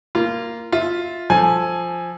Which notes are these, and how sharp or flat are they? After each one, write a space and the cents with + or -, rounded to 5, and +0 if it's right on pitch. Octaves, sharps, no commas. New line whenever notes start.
A#3 +0 F4 -20
F4 +0 E5 -15
F3 +0 A4 +0 G#5 +0